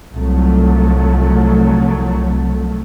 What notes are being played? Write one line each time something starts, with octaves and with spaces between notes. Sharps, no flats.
C2 F3 F#3 A3